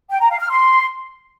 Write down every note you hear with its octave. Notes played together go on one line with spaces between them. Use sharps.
G5
A#5
F5
F6
C6